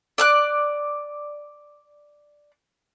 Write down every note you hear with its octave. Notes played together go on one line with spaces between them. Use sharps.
D5 D6 F#6